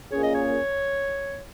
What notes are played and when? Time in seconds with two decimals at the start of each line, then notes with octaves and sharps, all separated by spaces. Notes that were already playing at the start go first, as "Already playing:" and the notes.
0.12 A#2 A#3 C#4 G#4 C#5
0.23 D#5
0.35 C#5